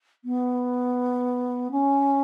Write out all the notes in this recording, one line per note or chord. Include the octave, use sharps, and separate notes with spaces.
B3
C#4